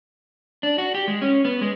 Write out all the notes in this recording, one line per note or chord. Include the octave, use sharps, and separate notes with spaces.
D4
F#4
G4
G#3
C#4
B3
G#3